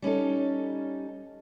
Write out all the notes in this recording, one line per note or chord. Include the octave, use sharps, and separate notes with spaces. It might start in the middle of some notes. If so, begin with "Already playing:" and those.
G3 C#4 D#4 A4